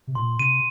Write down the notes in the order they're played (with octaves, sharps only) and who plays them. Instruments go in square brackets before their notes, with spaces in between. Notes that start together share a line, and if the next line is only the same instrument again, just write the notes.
[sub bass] C3
[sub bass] A#2 [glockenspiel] C6
[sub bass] C3 [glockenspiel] D#7